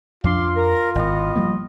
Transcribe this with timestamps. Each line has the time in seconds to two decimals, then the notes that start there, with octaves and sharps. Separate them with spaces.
0.24 F2 F3 D4 F4 F5 C6 D6
0.55 A#4
0.95 G#1 A2 B3 D#5
1.36 F3 G3 A#3